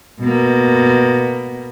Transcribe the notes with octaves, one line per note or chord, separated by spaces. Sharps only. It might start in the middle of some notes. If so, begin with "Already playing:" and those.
B2 A#3